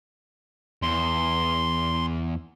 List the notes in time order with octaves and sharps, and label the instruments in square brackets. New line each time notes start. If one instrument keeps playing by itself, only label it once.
[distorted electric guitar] E2 [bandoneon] C6